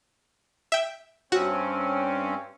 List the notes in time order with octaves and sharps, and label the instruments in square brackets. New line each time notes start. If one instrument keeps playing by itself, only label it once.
[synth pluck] E5 G5
[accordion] G2 C4 C#4 [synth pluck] F#4